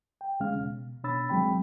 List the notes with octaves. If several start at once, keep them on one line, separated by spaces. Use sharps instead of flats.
G5
D#2 C#3 G#3 C#4 F5 F6
B2
B2 D4 C#5 B5 E6 A6
D#2 F#3 G#3 C4 G5 B5